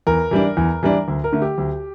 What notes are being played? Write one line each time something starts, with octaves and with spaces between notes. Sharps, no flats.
E2 A#4
E3 G3 D4
E2
E3 G3 D4
D2
A#4
D3 A3
G4
D2